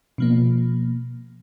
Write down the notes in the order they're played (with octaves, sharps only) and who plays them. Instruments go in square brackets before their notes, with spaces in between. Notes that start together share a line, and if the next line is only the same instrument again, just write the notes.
[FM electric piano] B2 F3 A#3